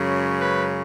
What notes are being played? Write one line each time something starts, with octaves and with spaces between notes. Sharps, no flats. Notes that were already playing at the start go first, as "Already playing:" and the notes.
Already playing: F#2 C#3 G#3
B4